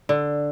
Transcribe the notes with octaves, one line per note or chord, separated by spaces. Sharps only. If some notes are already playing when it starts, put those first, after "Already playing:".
D3